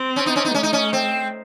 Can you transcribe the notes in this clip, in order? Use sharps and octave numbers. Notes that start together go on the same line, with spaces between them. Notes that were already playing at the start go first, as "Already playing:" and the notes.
Already playing: C4
C#4
D#4
C#4
D#4
A3 C#4
D#4
C#4
C4